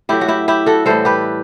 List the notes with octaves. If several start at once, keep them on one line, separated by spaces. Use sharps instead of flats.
A2 F#3 E4 G4
F#4
E4 G4
E4 G4
F#4 A4
A2 E3 G3 A4 C5
G4 B4